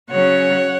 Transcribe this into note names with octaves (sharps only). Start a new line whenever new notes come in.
C#3 F#3 C#4 C#5 F#5